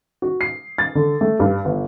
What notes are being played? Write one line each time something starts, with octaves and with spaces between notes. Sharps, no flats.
F#4
C7
A6
D3
A3
G2
G1